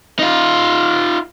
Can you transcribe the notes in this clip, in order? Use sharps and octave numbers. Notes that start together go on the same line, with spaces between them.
D#4 F4